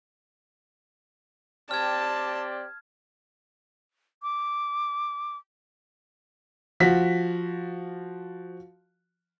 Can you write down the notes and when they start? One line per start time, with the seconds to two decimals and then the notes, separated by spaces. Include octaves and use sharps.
1.71 C4 G4 D5 A5 F6 G#6
4.23 D6
6.80 F3 F#4 F5 B6